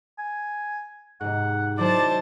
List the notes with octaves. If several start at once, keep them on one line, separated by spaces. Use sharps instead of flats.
G#5
G#2 C3 F#5
D#3 F#3 E4 C5 D5 A5